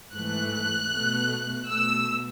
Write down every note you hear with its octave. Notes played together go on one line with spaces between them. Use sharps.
G#2 E3 A3 F#6
B2 A3
B2 A3 E6